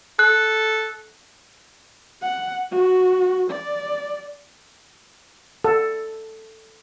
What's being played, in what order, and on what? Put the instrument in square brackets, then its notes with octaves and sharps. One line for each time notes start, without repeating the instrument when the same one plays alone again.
[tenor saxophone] A4 [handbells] F#6
[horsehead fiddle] F#5
F#4
D5
[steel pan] A4